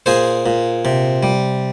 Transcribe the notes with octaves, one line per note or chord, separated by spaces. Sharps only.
A#2 G#4 C5
A#2
C3
G3